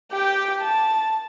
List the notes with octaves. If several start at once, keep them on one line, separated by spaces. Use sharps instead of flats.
G4 G5
A5